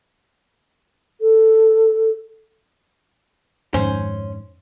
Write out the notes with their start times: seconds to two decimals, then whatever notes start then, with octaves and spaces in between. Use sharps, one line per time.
1.21 A4
3.74 F2 G#2 D#3 C#4 C5